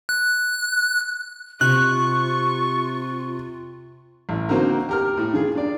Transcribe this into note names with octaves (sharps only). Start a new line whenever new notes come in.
F#6
C3 F4 C#6 F#6
A1
D3 A#3 C4 D#4 F#4 A#4
G4 A#4 F6
A2
D#3 F4 G#4
D4 D5